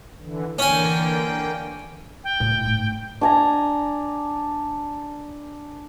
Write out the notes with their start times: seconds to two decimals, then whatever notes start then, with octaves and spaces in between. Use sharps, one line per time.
0.20 D3 E3
0.59 D3 E3 A#3 C#4 G5 G#5
2.24 G5
2.40 A2
2.65 G#2 A3
3.21 D4 G#5 A#5